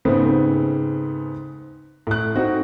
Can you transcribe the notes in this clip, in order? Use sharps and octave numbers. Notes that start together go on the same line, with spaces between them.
G#2 C#3 A3 B3 C4
A2 F#6
C4 D#4 F#4